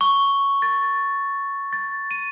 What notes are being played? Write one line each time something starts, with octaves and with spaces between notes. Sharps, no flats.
C#6
A6
A6
D#7